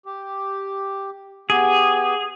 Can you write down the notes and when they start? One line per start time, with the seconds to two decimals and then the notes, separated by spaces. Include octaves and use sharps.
0.06 G4
1.50 B3 G4 G#4